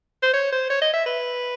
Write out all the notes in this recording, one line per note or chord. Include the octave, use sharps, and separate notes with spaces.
C5
C#5
C5
C#5
D#5
E5
B4